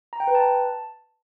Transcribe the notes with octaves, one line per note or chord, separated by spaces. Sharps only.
A#5
G5
B4
A5